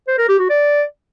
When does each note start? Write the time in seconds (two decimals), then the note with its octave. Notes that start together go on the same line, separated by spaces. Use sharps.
0.08 C5
0.18 A#4
0.29 G4
0.39 F#4
0.50 D5